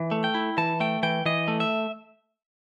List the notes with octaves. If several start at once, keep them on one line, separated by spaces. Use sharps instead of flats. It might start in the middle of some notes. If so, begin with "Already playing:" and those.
Already playing: E3
A3
G5
E4
E3 A5
A3 G5
E3 G5
E3 D#5
A3
E5